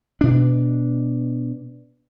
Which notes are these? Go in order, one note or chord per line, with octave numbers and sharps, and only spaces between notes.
B2 D4